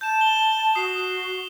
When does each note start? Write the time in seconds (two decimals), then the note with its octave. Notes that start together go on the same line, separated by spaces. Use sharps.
0.01 A5 G6 E7
0.21 A5 G7
0.75 F#4 D#6 C7